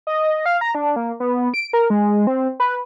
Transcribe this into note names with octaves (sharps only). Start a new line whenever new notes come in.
D#5
F5
A#5
D4
A#3
B3
D7
A#4
G#3
C4
B4